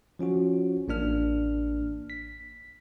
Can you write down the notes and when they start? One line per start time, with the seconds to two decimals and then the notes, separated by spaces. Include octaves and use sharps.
0.19 F3 C#4 F4 F#4
0.88 A1 A#3 D4 F6
2.10 B6